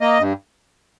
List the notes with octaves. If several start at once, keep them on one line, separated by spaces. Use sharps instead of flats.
A#3 D#5
G2